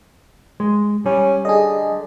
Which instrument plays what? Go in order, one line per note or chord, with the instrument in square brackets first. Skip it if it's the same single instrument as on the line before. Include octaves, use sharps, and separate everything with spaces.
[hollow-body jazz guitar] G#3
[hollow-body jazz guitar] G3 [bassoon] C#4
[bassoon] D3 [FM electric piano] G#4 D#5